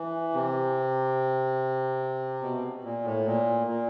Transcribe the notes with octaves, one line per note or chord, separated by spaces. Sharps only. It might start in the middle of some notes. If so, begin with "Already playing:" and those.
Already playing: E3
C3
B2
A#2
A2
A#2
A#2